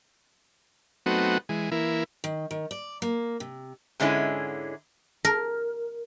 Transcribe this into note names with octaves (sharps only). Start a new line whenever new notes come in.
F#3 A3 B3 C4 D#4 F#4
E3 G#3
E3 A#3 E4
D#3
D#3
D5
A#3
C3
G#2 D3 G#3 C#4 E4
A#4